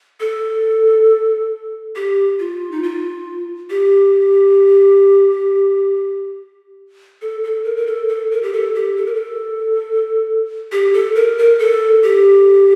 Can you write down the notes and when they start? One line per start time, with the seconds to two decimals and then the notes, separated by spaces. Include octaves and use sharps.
0.20 A4
1.96 G4
2.39 F4
2.71 D#4
2.83 F4
3.70 G4
7.22 A4
7.44 A4
7.65 A#4
7.76 A#4
7.87 A4
8.09 A4
8.31 A#4
8.43 G4
8.53 A4
8.75 G4
8.97 A4
9.06 A#4
9.15 A4
10.72 G4
10.94 A4
11.15 A#4
11.38 A#4
11.59 A4
12.04 G4